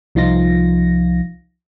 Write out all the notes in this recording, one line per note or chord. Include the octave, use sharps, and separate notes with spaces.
C2 F3 D#4 F4 A#6